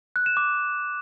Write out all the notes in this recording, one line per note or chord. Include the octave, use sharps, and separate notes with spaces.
F#6
E7
D6